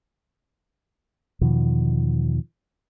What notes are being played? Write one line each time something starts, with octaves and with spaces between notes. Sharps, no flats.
E2 B2 D#3 F3